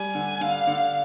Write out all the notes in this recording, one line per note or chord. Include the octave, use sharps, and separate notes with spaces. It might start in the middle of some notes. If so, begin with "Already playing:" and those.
Already playing: G3 G#5
D3
D3 F5
D3